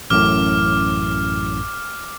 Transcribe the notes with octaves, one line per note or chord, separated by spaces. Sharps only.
A1 F#2 A2 D6 F6